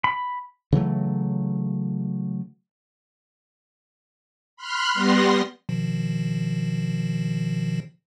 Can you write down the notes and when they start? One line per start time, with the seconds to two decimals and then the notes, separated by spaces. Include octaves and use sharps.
0.04 B5
0.72 C#3 E3 F#3 A3
4.57 B5 C6 F6 F#6
4.94 G3 B3 C6 A#6
5.69 B2 D#3 F3